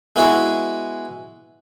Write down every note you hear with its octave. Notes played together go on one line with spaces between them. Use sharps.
G#3 B3 E4 F#4 G#4